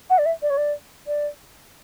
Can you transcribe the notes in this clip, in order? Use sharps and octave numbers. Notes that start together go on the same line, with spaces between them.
F#5
D5
E5
D5
C#5
D5
D5